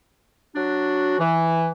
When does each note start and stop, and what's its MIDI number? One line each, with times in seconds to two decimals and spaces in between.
0.56 1.19 54
0.56 1.19 62
0.56 1.19 66
1.19 1.70 52